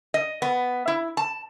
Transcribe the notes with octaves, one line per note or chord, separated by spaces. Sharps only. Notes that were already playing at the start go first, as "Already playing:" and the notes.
D#5
B3
E4
A5